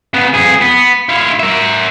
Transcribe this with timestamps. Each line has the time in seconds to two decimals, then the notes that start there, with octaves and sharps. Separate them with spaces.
0.14 C#3 B3
0.34 F2 G#4
0.62 B3
1.09 E4 F5
1.40 A#4 E5